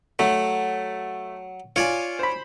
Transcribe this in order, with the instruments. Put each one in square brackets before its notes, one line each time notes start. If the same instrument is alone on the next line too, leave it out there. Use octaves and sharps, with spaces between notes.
[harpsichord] F#3 [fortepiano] A3
[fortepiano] F4 G#5 [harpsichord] C#5 D5
[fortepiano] C5 B5